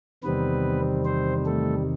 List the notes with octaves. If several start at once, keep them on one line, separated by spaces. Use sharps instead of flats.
E2 C3 D#3 G3 B3 C4 B4
C4 C5
A3 A4